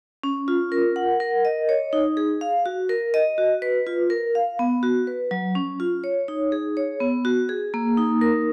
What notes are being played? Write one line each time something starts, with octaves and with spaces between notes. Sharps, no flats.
C#4
F4
A#4
F#5
A#4
D#5
C#5
D#4
G#4
F5
F#4
A#4
D#5
F#4
B4
F4
A#4
F5
B3
F#4
B4
F#3
C#4
F4
C#5
D#4
G#4
C#5
B3
F#4
G#4
A#3
D#4
A#4